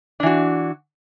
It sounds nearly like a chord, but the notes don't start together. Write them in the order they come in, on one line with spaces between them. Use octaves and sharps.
D4 E3 F#4